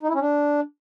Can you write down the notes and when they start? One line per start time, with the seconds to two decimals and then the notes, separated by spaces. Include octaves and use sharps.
0.03 D#4
0.09 E4
0.15 C#4
0.21 D4